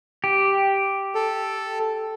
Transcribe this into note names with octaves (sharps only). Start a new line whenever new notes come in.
G4
A4